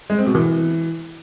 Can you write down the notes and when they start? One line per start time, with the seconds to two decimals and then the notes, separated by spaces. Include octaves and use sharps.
0.10 G#3
0.18 C4
0.26 B2
0.35 E3